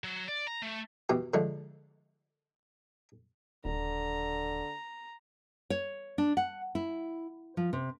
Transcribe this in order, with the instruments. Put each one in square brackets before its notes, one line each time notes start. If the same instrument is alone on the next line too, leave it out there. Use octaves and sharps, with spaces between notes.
[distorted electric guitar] F#3
D5
A#5
A3
[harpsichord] B2 E3 G4
D3 F3 G#3 A3
[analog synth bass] D#1 [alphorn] D3 [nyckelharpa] A#5
[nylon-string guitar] C#5
D4
F#5
E4
F3
C3